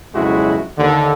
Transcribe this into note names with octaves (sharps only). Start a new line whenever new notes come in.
B1 F2 C#3 G#3 E4 F#4
D#2 D3